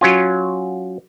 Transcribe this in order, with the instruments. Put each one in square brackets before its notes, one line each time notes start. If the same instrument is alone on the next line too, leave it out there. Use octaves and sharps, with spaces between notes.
[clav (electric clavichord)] F#3 C#4 F4